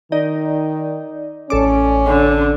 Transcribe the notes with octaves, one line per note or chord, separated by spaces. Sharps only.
D#3 D#4 D5
A1 C#4 A4 D6
D3